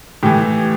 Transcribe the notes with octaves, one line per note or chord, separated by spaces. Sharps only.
A2 E3 G4